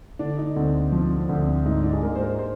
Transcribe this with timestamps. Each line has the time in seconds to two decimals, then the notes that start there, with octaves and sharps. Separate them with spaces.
0.19 D3 D4
0.37 D#4
0.56 D2 C4
0.92 F3 C4
1.17 C4
1.29 D2
1.41 C4
1.65 G#2 D#4
1.84 D4
1.93 G#4
2.02 G#2 A#4
2.15 C5
2.21 A#4
2.39 C5